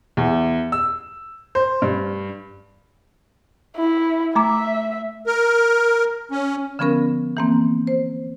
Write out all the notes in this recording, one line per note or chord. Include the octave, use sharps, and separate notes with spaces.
E2
E6
C5
G2
E4
A3 E5 A#5 D6
A#4
C#4
D3 F3 B3 C#4 A#4
E3 A#3 C4
C5